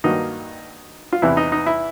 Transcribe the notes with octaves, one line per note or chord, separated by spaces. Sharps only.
G2 D#3 F#3 A#3 D#4
F4
E2 C3 E3 E4
D#4
D#4
E4